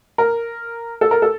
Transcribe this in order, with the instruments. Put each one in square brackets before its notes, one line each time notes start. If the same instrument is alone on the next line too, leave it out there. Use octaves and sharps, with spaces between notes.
[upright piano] A#4
A4
A#4
A4